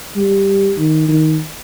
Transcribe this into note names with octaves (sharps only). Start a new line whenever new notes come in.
G3
D#3
D#3